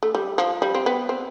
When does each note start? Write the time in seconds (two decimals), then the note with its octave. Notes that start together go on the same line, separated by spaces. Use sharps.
0.03 A3
0.15 G3
0.38 F3
0.62 G3
0.74 C4
0.86 B3
1.09 C4